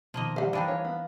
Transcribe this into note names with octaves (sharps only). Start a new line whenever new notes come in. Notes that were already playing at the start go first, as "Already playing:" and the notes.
B2 D#3 F3 A#3 D#5
G3 C5 E5 F#5
E3 D4 D#4 F5 G5
C#5 F5
B3